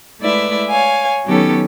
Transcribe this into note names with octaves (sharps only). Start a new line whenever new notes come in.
G#3 A3 E4 B4 D5 E5
C#5 F5 G#5
D#3 F#3 B3 C#4 G4 A4